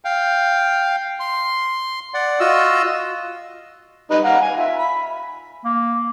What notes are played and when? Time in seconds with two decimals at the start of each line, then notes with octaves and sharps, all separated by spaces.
0.05 F5 G5
1.20 C6
2.14 D5 F#5
2.40 F4 F#4 D#5 E6
4.10 G3 D#4 B4
4.24 F5 F#5 A#5
4.41 G#5
4.57 F4 E5
4.78 B5
5.65 A#3